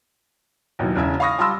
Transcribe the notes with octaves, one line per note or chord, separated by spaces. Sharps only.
D#2 B2 E3 F#3
E1 C#3 E4 E5
F5 B5 C#6 D#6 A#6
G3 F4 A5 B5 C6 E6